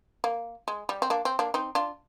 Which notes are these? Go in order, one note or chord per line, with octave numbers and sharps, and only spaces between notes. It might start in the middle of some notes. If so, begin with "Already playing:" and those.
A#3
G#3
G3
C4
A#3 D4
C4
A#3 D4
C4 D#4
D4 F4